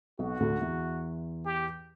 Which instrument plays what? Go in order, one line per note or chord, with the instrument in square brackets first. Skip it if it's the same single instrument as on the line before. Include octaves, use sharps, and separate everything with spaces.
[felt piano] B1 B2 [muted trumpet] F#4
[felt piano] D2 D3
E2 E3
[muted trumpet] G4